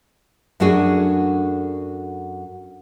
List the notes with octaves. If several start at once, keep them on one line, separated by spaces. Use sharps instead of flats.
F#2 A3 D4 F#4 G#4